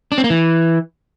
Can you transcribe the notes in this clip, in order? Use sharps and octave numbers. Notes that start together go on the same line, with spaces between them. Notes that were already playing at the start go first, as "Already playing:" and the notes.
D4
C4
A#3
E3